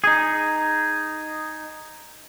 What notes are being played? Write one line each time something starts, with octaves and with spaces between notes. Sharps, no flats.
D#4 G#4